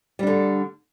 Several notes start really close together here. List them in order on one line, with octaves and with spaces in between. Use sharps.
G3 D4 D3